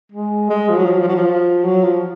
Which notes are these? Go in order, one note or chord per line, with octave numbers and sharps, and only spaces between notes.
G#3
G#3
F3
F#3
F3
F#3
F3
F#3
F3
F#3
F3